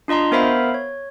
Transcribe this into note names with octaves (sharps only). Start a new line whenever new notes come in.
D4 F4 D#5 A#5 C6
B3 A#4 C5 E5 F5 B5
C#5